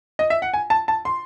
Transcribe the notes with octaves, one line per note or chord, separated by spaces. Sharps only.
D#5
E5
F#5
G#5
A5
A5
C6